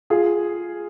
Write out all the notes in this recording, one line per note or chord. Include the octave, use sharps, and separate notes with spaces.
F4 G#4